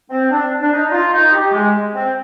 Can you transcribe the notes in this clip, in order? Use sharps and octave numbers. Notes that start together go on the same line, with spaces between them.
C4
D4
D4
D#4
F4
D#4
G4
G#3
C4